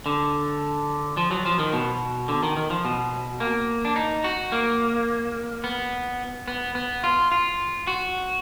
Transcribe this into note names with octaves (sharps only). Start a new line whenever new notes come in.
D3
F3
F#3
F3
D#3
B2
D3
D#3
D#3
F3
B2
A#3
D4
D#4
F#4
A#3
B3
B3
B3
F4
F4
F#4